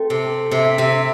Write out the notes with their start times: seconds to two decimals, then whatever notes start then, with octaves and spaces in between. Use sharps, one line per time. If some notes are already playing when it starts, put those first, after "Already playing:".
Already playing: A3 C4
0.10 C3
0.51 C3 E5
0.78 C3